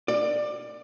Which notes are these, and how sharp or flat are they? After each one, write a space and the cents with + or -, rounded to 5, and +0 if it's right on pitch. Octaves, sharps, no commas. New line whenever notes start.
D5 +20